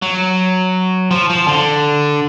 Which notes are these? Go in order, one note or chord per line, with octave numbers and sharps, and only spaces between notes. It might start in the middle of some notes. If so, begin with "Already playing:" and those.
F#3
F3
F3
D3